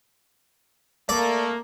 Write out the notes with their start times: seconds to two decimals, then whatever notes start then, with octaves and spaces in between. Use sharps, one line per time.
1.09 A3 A#3 D5